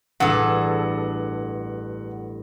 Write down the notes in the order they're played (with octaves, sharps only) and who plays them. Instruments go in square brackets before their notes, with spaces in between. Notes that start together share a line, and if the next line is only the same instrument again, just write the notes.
[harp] A1 G#4 [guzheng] G2 A4 [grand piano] F#5